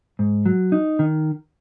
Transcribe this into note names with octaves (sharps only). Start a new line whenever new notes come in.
G#2
F#3
D#4
D#3